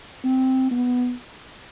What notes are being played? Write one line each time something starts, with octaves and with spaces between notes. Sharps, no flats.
C4
B3